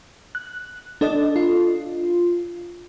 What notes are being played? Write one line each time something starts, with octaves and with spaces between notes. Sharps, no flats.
F#6
D4 A4 D5 D#5
F4